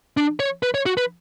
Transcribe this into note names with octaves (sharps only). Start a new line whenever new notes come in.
D4
C#5
B4
C#5
F#4
B4